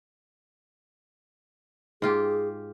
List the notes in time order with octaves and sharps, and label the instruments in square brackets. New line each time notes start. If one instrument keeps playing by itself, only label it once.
[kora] G#2 F4 G4 [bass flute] G#4